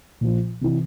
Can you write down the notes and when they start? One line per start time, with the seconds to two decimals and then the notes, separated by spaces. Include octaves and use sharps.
0.21 A#2 F3
0.61 C3 E3